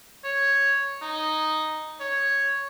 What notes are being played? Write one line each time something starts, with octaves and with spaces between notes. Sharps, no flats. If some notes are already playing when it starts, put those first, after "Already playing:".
C#5
D#4
C#5